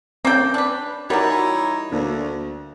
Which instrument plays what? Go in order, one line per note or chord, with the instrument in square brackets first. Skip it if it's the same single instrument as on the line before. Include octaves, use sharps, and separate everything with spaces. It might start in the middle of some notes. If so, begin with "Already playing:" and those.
[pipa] A#3 A4 G5 [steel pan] C4 C#4
[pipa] D4 B4
[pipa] E3 G3 [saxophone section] D#4 E4 C#5 [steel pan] F#4 A#4
[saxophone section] D2 [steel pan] A#3 D4